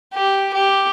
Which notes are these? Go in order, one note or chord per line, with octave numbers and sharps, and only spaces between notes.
G4
G4